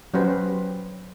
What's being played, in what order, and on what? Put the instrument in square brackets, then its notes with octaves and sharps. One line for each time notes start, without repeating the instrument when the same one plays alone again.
[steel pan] F#3 C#4 F#4 G4 B4 C5